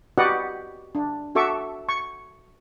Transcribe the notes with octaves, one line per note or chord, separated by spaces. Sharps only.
F#4 G4 B4 D5 D#5 F#5
D4
F#4 A4 E5 C#6 D6
C#6